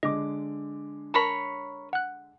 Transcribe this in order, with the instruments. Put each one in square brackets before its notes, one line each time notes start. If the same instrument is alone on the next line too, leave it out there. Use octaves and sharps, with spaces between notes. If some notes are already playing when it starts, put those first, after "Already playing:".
[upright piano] D3 G#3 D6 [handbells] D#5
[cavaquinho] A#4 C#5 B5 [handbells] A5
[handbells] F#5 F#6